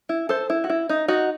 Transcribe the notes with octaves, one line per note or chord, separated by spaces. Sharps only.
E4
A4 C5
E4
F#4
E4
D#4
D#4 F#4